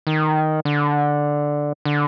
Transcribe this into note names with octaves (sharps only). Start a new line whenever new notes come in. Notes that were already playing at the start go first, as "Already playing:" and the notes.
D#3
D3
D3